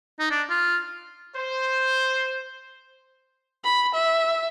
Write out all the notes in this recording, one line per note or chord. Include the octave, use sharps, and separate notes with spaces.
D#4
D4
F4
C5
B5
E5